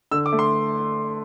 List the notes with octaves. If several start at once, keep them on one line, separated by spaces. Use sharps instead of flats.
D3 E6
D6
A3
C6